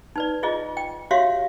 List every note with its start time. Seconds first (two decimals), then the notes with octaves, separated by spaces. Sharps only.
0.16 D#4 B4 D5
0.43 E4 F4 G#4 D#5
0.77 G5
1.11 F#4 G4 C#5 E5 F5 C6